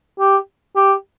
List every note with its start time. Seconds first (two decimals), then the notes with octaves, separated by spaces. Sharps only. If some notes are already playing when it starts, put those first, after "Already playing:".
0.19 G4
0.76 G4